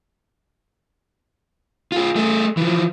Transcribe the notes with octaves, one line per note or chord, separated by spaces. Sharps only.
F4 G#4
A3 G#4
E3 F3